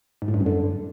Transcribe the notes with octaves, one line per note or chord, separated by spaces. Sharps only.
G#2
A2
G2
F#2
D3